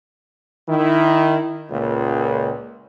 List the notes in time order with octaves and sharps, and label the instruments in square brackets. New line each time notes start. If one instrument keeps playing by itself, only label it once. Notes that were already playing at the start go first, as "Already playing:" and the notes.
[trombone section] D#3 E4
C#2 A#2